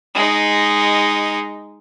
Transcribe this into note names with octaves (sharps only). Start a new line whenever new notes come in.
G#3 D#4